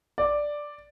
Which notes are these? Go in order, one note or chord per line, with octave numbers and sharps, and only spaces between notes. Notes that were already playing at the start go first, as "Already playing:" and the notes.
D5